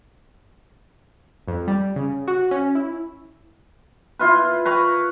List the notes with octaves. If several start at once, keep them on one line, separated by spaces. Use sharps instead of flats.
F2
G3
C#3
F#4
C#4
E4
E4 F4 B4
B4 A#5 C#6